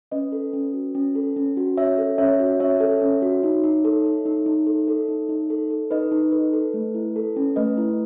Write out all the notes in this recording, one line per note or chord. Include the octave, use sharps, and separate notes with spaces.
C#4 B4 D#5
A4
C#4
F#4
C#4
A4
C#4
F#4
C#4 C#5 E5
A4
C#4 C#5 E5
F#4
C#4 C#5 E5
A4
C#4
F#4
D#4
D#4
A4
A4
D#4
D#4
A4
A4
D#4
D#4
A4
A4
D#4 B4 D#5
D#4
A4 B4
A4
A3
E4
A4
C#4
A3 B4 D#5
E4